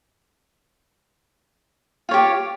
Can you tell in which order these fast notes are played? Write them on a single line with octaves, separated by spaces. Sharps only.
F4 C#5 G4